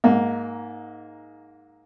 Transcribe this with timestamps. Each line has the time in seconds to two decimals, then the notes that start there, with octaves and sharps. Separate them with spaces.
0.04 G#2 A#3